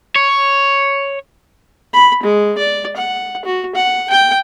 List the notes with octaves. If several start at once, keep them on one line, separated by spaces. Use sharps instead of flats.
C#5
B5
G#3
D5
F#5
F#4
F#5
G5